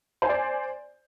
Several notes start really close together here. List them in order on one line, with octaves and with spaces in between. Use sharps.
C5 G#5 D5